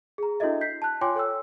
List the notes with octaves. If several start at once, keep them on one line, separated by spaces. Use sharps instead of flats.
G#4 A#5
D4 E4 F#4 A4 D#5 E5
G6 B6 C7
A5 F#6
F4 C#5 G5 G#5 C6 D6
A4 C#5 G5 E6